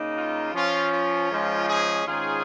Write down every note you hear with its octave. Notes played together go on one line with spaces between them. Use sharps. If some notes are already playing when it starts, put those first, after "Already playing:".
Already playing: C#3 A#3 D#4
F4
F3 C#4 F4
F4
G#2 F3 G#3 C#4
G#4
G#2 D#3 C#4 F4 G#4